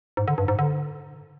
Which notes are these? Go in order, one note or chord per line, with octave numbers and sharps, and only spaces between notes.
G#2
D3
G2
G#2
D3